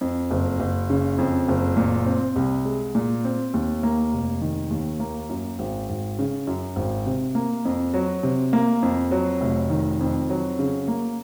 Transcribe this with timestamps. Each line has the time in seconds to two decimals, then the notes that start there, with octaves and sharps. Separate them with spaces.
0.01 F2
0.31 F#1
0.60 F#1
0.90 C#3
1.18 F2
1.48 F#1
1.77 A#2
2.06 C4
2.36 C2
2.65 G#3
2.95 A#2
3.24 C4
3.54 D#2
3.83 A#3
4.12 F1
4.41 D#3
4.70 D#2
5.00 A#3
5.29 F#2
5.59 G#1
5.89 G#1
6.19 C#3
6.47 F#2
6.76 G#1
7.06 C3
7.35 A#3
7.65 F2
7.94 F#3
8.23 C3
8.53 A#3
8.82 F2
9.11 F#3
9.41 F1
9.70 D#3
10.00 F2
10.30 F#3
10.59 C#3
10.88 A#3